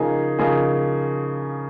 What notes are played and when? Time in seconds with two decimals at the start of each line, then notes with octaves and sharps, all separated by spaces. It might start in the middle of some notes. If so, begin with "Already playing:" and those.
Already playing: C#3 F3 A#3 D#4 G#4
0.39 C#3 F3 A#3 D#4 G#4